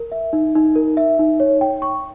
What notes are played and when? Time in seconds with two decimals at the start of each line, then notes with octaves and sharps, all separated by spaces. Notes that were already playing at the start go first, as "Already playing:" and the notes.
Already playing: A#4
0.12 E5
0.33 D#4
0.55 D#4
0.76 A#4
0.97 E5
1.19 D#4
1.40 C#5
1.61 G5
1.82 C#6